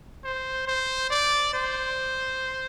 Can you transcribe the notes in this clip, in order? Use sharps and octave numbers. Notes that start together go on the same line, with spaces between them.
C5
C5
D5
C5